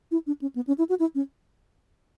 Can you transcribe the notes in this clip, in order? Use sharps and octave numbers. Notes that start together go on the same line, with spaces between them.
E4
D4
C#4
B3
C#4
E4
F#4
E4
C#4